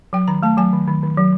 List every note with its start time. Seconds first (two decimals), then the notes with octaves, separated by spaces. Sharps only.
0.13 F#3 G5
0.28 D#3 A#5
0.43 A3 A5
0.57 F#3 G#5
0.73 D#3
0.88 D#3
1.03 D#3
1.17 F#3